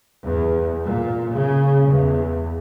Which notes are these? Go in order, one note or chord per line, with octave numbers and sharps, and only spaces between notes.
E2
A#2
C#3
E2